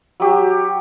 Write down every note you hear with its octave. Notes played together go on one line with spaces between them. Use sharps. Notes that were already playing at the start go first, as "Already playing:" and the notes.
F#3 G4